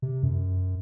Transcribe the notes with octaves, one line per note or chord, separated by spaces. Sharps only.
C3
F#2